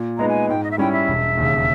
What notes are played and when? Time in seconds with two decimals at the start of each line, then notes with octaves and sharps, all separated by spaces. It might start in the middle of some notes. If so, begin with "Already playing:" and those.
Already playing: A#2
0.17 G#3 B3 D#4 A#5
0.29 G#5
0.49 G#2 G5
0.64 D#5
0.71 E5
0.78 G3 C#4 E4 G5
0.93 E5
1.08 E1
1.37 D#2 C#3